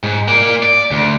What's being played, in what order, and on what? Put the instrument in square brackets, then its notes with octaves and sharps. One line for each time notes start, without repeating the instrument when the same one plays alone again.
[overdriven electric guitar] G#2
A#3 D5
D5
D2